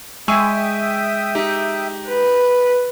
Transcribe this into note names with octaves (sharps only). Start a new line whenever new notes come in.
G#3 E5 G5 G#5 C#6 D#6 E6
D#4 G4
B4